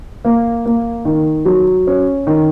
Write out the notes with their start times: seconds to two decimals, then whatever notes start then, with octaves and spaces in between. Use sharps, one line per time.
0.25 A#3
0.66 A#3
1.05 D#3
1.45 F#3
1.87 C#4
2.27 D#3